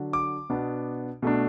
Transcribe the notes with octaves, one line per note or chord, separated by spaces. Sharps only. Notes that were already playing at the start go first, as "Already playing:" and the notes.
Already playing: D3 F#3 D4
D6
B2 B3 D4
B2 A3 D4